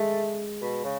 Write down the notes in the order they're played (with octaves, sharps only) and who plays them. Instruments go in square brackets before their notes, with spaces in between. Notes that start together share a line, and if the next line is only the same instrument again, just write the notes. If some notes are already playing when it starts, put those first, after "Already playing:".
Already playing: [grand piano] G#3 [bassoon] A3
[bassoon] B2
C#3